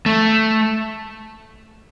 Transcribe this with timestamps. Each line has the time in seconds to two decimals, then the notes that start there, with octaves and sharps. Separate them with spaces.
0.06 A3